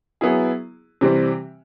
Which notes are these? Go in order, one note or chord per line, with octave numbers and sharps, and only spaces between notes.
F#3 B3 E4 G#4
C3 E3 G3 C4